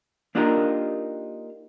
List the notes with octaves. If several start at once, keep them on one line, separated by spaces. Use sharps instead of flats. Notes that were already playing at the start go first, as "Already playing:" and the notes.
A#3 D4 D#4 F4 G4 A#4